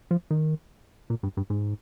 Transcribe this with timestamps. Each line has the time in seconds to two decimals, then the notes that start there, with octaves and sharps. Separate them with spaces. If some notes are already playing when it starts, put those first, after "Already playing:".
0.11 F3
0.31 D#3
1.10 A#2
1.23 G2
1.37 G2
1.50 G#2